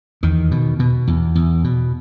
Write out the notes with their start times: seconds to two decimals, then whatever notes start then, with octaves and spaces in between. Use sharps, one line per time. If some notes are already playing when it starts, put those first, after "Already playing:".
0.23 E2 D#3
0.51 B2
0.79 B2
1.07 E2
1.35 E2
1.64 B2